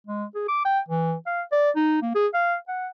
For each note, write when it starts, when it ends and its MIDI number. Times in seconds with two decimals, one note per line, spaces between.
0.06 0.24 56
0.35 0.45 68
0.48 0.62 86
0.65 0.80 79
0.88 1.14 52
1.26 1.42 77
1.52 1.70 74
1.75 2.02 63
2.02 2.13 58
2.14 2.27 68
2.34 2.55 77
2.68 2.87 78